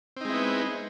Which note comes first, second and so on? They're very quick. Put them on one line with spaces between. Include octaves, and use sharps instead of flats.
C4 D#4 G#3 E4 B3